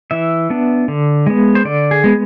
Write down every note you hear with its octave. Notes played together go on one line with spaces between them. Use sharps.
E3 E5
B3 D4
D3
G#3 B3
C5
D3 D5
G#4
G#3 B3